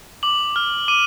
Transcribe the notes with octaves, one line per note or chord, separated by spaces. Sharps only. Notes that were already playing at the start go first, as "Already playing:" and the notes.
D6 F#7
F6
D6 D#7